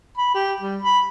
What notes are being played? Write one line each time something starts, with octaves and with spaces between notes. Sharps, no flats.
B5
G4
G3
B5